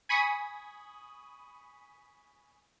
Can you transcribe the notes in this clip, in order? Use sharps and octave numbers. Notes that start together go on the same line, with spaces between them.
G#5 B5 C#6 D#6